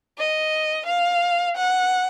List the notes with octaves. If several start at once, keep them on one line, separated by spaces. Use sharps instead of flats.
D#5
F5
F#5